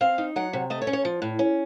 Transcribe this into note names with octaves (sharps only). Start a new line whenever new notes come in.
C4 F5
D#4
F#3 F#5
C3
A3 D#5
C#5
C#4
C#5
F3
A2
C#4